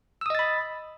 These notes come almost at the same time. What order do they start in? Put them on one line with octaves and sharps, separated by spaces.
E6 D#6 D#5 A6 B5